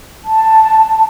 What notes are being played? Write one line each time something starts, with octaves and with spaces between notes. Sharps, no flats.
A5